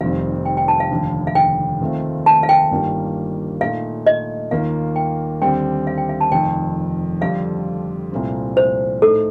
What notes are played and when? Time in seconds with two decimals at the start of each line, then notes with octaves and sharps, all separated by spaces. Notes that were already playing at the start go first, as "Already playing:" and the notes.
0.01 F1 F2 D#3 G3 C4 F5
0.45 G5
0.57 G5
0.68 A5
0.80 F5
0.90 F1 D#2 D3
1.27 F5
1.35 G5
1.81 D#2 D#3 A3 C4 F4
2.26 A5
2.43 F5
2.49 G5
2.71 G1 G2 D#3 G3 A#3
3.61 A#2 A3 D#4 F5
4.07 D#5
4.51 D#2 D#3 A#3 F4 F5
4.96 G5
5.42 D#2 D3 G3 C4 G5
5.87 F5
5.98 G5
6.09 F5
6.21 A5
6.31 F1 F2 D#3 G5
7.21 F2 D3 G3 D4 F4 F5
8.12 C2 A#2 A3 C4
8.57 C5
9.02 A2 A3 D#4 A4